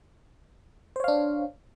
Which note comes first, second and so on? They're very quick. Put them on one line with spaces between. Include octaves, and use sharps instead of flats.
C5 C#5 F5 D4